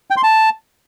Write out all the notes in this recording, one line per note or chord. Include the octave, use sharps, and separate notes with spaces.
G5
C6
A5